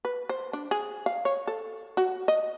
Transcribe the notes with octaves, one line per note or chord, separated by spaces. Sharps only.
B4
C5
D4
G#4
F5
C#5
A4
F#4
D#5